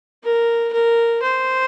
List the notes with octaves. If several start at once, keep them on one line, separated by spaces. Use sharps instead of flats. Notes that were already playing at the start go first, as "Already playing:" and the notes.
A#4
A#4
C5